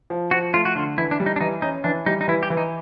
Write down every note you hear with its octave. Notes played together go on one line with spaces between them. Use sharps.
F3
F3 F#4
A3 F4
F#4
D3 F4
E3 E4
D4
G3
D#4
D4
E3 D#4
C#4 D#4
E3 D4
G3 D#4
D#4
E3 E4
G4
E3
D#4